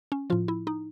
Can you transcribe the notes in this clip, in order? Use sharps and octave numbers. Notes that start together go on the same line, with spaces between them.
C#4
A2 F3 F4
E4
D#4